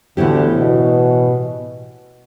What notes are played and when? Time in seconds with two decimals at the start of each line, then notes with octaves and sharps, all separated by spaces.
0.17 D2 A2 D3 E3 B3 E4 G4
0.55 B2